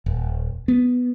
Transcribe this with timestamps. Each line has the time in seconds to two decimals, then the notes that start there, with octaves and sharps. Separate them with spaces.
0.06 D#1
0.68 B3